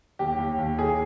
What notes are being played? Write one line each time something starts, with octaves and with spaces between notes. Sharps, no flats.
D#2 G4
D#2
D#2
D#2 G#4